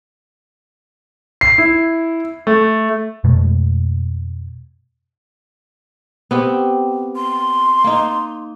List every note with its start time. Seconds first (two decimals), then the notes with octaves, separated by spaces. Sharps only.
1.41 C7
1.58 E4
2.47 A3
3.24 F2 B2 G#3 A3
6.31 B3 C4 G4
7.16 C6
7.84 A#3 D#4